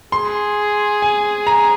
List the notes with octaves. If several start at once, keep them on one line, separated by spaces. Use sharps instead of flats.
G#4 C6
G#5
A#5